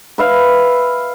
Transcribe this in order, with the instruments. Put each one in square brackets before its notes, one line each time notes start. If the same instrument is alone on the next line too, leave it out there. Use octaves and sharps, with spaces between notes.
[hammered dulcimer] B4 E5 F5